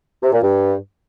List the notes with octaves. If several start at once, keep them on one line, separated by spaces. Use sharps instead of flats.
C3
A#2
G2